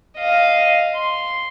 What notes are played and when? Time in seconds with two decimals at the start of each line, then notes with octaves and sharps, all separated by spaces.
0.18 D#5 F5
0.95 C6